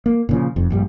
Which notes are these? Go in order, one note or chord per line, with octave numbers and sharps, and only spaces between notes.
A#3
A#2 C#3 F3
F1 F2
A#1 G2 G3